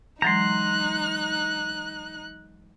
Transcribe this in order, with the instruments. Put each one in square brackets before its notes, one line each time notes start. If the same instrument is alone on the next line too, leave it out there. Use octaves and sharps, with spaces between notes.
[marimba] E3 F#3 G#3 [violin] D#4 F#6 [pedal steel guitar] A#5 C6